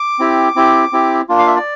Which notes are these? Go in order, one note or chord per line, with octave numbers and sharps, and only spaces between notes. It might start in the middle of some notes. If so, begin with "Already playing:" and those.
Already playing: D6
C4 E4 G4
C4 E4 G4
C4 E4 G4
A#3 D4 F4
F5
E5
D5